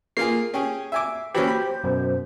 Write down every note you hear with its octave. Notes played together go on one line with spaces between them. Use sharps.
A#3 F4 G#4 C7
C#4 G4 G#4
E5 G#5 D6
E3 F#3 C#4 G4 C5
B5
F#2 B2